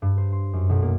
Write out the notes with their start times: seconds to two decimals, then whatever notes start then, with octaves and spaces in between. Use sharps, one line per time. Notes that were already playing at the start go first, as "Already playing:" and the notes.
0.02 G2
0.17 C5
0.32 C6
0.53 F#2
0.69 B1
0.82 A#3